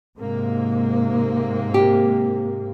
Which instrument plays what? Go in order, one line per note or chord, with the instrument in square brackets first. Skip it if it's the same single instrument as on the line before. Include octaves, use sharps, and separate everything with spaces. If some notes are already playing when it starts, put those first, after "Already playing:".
[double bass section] G#2 C3 A#3
[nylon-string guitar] G4